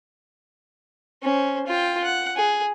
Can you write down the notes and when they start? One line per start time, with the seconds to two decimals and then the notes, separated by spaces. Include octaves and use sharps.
1.23 C#4 C5
1.67 F4 G5
2.04 F#5
2.36 G#4